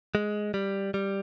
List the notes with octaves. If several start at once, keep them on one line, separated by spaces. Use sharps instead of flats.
G#3
G3
G3